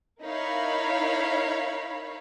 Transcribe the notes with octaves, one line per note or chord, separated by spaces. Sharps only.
D#4 E4 A#4 C#5 F5 B5